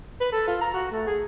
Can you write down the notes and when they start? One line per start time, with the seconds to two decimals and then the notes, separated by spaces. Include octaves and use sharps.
0.21 B4
0.32 A4
0.47 F4
0.61 A#5
0.74 F#4
0.92 A3
1.07 G#4